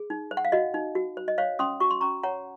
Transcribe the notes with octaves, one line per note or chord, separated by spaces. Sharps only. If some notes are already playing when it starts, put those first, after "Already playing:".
Already playing: G#4
D#4
C5
F#5
F5
F#4 D#5
D#4
F#4
C5
D#5
C5 C#5 F5
C#4 C6 D#6
F#4 C#6
C6
C#4 A#5 C#6
C#5 F#5 A#5